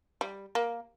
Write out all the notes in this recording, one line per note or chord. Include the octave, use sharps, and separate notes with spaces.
G3
A#3